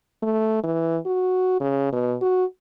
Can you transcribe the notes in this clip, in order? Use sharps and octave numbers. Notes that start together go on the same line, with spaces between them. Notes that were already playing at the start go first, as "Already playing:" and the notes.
A3
E3
F#4
C#3
B2
F#4